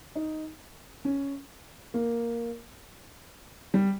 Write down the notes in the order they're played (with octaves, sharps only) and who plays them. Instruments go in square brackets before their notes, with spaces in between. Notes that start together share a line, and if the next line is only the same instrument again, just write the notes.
[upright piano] D#4
C#4
A#3
G3